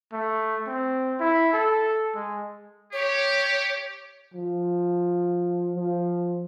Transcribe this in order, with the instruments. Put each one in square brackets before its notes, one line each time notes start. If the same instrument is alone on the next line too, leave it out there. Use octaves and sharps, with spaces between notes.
[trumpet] A3
C4
E4
A4
G#3
[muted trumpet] G4 [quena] C#5
[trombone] F3
F3